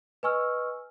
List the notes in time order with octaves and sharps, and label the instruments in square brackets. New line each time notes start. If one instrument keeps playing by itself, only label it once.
[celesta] B4 D#5 G#5 C#6 E6 F6